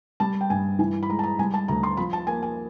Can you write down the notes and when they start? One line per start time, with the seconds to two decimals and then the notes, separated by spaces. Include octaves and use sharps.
0.20 G3 A5
0.41 G5
0.50 G2 G#5
0.79 E3 G#5
1.03 B5
1.09 G#3 A#5
1.19 A5
1.23 A#5
1.39 G3 G#5
1.54 A5
1.68 D2 A#5
1.83 C6
1.97 F3 B5
2.13 A5
2.27 A#3 G#5
2.43 G#5